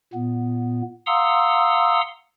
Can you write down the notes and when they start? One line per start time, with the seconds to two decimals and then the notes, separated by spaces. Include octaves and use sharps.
0.14 A#2 B3
1.06 F5 F#5 A#5 C6 D#6 E6